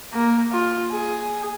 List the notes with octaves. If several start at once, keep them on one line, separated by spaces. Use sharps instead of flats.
A#3
F4
G#4